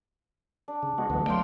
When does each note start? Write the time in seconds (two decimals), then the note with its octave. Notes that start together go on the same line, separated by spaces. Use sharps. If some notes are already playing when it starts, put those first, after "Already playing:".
0.68 D4
0.83 C#3
0.98 G#3 B3 F#4
1.10 D2 E3 F#3 B3
1.26 F#3 A3 D5 F5 G5 C6